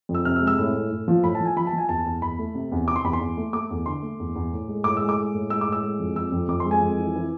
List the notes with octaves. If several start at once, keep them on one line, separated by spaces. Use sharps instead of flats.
F2
E6
C3 F6
E6
G#3
E6
A2
A2
A2
F3
A2 B5
A5
F3 G#5
F3 B5
A5
F3 G#5
E2 A5
E2
E2 B5
A3
C3
E2
C3 D6
C6
E2 B5
C6
E2
A3
A3 D6
E2
D3 C6
A3
E2
E2
A2
G#3
A2 D6
G#3 E6
D6
G#3
A2
G#3 E6
D6
A2
E6
G#3
F2
F2 E6
F2
F2 D6
C6
G#3
G#5
F2
E3
E3